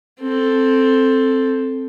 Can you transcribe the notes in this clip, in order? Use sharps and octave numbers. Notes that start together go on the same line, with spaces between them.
C4 A4